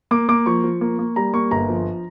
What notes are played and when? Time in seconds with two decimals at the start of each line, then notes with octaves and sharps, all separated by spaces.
0.11 A#3 D6
0.29 A#3 D6
0.46 F3 C#6
0.64 F3
0.81 A#3
0.99 A#3
1.16 G3 A#5
1.34 A#3 C#6
1.51 G1 A#5
1.69 F3